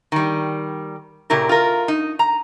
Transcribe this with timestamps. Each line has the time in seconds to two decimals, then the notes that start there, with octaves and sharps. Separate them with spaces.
0.12 D#3 G3
1.30 A#2 C#3 E4 G4 A#4
1.49 F4 A#4
1.88 D#4
2.19 A#5